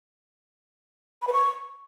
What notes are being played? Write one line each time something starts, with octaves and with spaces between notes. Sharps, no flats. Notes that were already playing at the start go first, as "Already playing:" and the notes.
B5
B4
C#6